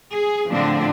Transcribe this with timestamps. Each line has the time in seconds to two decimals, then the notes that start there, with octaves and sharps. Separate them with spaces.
0.13 G#4
0.51 A2 D3 F3 C4 D4